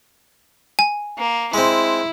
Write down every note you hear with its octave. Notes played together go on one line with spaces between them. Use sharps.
G#5
A#3
G#3 C4 E4